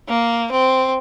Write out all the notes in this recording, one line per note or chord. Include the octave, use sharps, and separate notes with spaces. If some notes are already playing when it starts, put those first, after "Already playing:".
A#3
C4